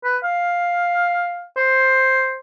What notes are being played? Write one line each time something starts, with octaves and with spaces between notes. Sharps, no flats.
B4
F5
C5